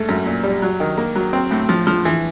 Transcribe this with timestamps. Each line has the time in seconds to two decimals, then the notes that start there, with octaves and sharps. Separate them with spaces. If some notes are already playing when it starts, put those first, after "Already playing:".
Already playing: G#2 A3
0.09 F#2
0.26 A#2
0.43 G3
0.62 F#3
0.80 D#3
0.97 A#3
1.15 F#3
1.33 C4
1.51 A2
1.69 F3
1.87 F3
2.05 E3